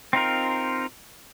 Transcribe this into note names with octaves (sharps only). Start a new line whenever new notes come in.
C4 D#4 F4 A#4